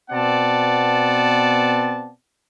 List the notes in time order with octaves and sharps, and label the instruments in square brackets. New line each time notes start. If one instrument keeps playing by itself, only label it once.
[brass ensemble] B2 B3 C4 D5 F#5 A5